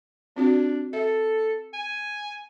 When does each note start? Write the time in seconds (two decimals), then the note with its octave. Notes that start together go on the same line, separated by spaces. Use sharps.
0.36 C4 D4 F4 F#4
0.93 A4 E5
1.73 G#5